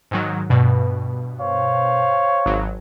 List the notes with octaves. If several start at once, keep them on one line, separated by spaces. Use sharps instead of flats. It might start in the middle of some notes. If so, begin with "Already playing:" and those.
G#2 D#3 F#3
G2 B2 B4
C5 C#5 F5
G#1 F#3